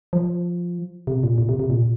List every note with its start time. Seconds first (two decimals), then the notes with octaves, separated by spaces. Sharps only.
0.13 F3
1.07 C3
1.23 A#2
1.38 A#2
1.49 C3
1.59 C3
1.70 A#2